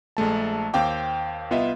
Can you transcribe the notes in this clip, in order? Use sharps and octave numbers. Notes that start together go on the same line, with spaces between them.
A#1 G#3 A3 A5
D#2 C4 F5 G5 D6
C2 B3 F4 D#5 E5